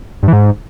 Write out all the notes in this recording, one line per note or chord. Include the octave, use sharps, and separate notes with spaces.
G2
E3
G#2